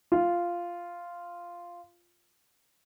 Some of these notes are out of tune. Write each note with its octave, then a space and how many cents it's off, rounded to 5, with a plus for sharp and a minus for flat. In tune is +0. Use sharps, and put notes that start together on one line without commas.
F4 -5